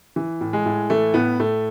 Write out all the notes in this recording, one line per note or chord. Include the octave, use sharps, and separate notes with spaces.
E3
A2
G#3
A2
E3 A3
A2 B3
A2 A3